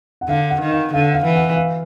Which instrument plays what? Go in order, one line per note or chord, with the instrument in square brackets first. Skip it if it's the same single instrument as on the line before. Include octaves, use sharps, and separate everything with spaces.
[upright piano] F#5
[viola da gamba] D3 [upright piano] F5
[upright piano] F#5
[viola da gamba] D#3
[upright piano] F5
[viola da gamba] D3 [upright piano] F5
[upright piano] F5
[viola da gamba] E3
[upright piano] F#5
F5